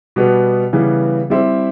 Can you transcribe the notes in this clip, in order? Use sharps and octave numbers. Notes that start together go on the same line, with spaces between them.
B2 G3 B3
C#3 E3 G3 B3
G3 C4 E4